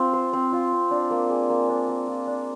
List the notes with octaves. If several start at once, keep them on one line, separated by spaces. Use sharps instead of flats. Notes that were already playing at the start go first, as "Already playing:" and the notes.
Already playing: C4 F4
C5
C4
F4
C4
D4
A#3
G#4
A#3
D4
A#3
F4
D4